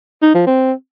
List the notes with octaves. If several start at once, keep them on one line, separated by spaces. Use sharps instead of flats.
D#4
F3
C4